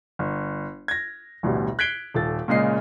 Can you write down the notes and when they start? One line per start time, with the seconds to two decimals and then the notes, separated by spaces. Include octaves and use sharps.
0.19 G1
0.88 G#6 A#6
1.43 A1 D2 B2 G3
1.79 F#6 G#6 B6 C7 D7 G7
2.14 D#1 A4 A6
2.48 A#2 C#3 G#3 D#5 C7